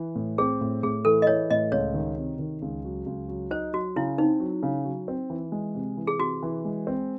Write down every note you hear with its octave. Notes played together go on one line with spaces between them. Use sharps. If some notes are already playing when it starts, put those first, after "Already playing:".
Already playing: E3
A2
C4 G#4
A2
A2 G#4
E3 A4
D#5
E3 C#5
A2 D#5
C#2 C#5
D#3
C3
D#3
C#2
F#3
C#2
F#3
D#4 C5
F#3 F#4
C#3 E4
C4 D#4
F#3
C#3
F#3
C4
E3
G#3
C3
E3
G#4
C3 F#4
E3
G#3
C4